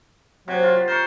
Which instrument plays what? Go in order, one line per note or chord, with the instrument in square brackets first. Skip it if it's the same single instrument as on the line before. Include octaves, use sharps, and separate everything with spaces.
[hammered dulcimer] C3 [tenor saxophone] F#3
[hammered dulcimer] F4
[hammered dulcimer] A#4 C#6 [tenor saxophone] C5